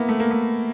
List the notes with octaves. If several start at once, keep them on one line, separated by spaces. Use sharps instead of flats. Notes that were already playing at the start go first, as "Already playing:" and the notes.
Already playing: A#3 B3 E4
A3
A#3
A3